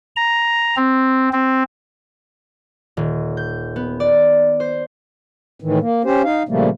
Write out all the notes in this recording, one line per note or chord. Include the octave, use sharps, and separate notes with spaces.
A#5
C4
C4
D#1
G6
B3
D5
C5
A2 D#3 E3
A#3
C#4 G4 C5
D#4 F5
A#2 C#3 F3 G3 A3 A#3